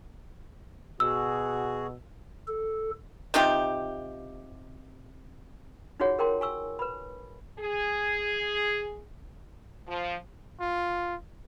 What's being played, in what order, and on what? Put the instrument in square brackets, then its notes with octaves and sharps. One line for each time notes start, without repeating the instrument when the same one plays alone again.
[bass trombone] B2 [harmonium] F#4 G#4 [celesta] E6
[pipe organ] A4
[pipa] C3 D#4 F4 G4
[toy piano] D#4 F4 F#4 G#4 C#5 F#5
G#4 A#4 G5 A#5 C6
G#5 C#6 E6
B4 B5
[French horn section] G#4
F3
[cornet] F4